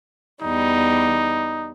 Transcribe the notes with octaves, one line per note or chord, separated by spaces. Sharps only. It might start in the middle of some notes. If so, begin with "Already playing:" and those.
E2 G3 D#4